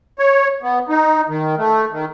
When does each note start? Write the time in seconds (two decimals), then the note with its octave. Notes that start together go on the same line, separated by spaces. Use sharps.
0.19 C#5
0.63 B3
0.89 D#4
1.29 D#3
1.58 A3
1.92 D#3